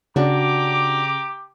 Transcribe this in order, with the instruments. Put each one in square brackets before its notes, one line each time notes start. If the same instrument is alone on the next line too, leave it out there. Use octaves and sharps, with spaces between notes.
[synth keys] C#3 [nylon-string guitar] D4 F#4 [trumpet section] G4 A#5 D6